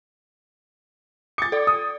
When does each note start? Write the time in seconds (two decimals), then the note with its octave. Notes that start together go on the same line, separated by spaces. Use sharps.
1.38 D6 D#6 A6 C#7
1.52 A4 D5
1.67 D#6